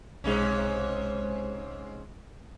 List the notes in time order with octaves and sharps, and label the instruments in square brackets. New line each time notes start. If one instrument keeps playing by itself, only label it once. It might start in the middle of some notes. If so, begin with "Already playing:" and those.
[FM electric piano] B1 G#3 [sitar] G#2 C3 C#4